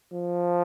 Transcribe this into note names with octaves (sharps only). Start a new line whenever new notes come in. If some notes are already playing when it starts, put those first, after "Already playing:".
F3